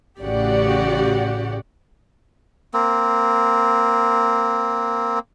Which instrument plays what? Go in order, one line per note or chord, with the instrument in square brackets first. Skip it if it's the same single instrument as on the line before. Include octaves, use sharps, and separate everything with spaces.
[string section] A1 C#3 F#4 G4 D5 F#5
[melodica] A#3 C4